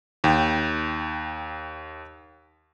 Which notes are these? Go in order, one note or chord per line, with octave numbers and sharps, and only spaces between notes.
D#2 G5